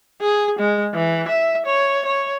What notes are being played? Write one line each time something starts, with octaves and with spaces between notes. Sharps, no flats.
G#4
G#3
E3
E5
C#5
C#5